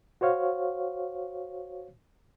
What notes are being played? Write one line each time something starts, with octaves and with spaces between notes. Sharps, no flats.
F#4 C5 C#5 F5